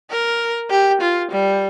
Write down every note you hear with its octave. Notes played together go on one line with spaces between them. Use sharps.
A#4
G4
F4
G3